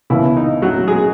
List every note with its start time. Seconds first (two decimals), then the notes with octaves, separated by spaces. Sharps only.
0.10 C#2 B2 E3 A#3 E4
0.37 D#4
0.62 F#3 F#4
0.87 G#3 G#4